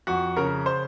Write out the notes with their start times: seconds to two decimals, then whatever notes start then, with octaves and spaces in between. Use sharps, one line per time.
0.07 F2 F#4
0.37 C#3 A#4
0.66 C5